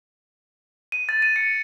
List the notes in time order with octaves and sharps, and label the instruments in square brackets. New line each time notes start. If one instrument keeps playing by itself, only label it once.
[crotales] D#7
A6
D#7
C#7